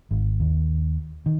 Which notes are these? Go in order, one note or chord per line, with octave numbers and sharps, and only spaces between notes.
G#1
D#2
D#3